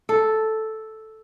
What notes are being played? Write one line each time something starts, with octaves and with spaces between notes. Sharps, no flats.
A4